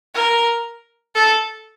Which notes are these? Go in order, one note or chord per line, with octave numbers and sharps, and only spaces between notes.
A#4
A4